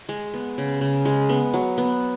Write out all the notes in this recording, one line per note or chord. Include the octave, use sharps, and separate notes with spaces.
G#3
B3
C#3
C#3
G#3
B3
F#3
B3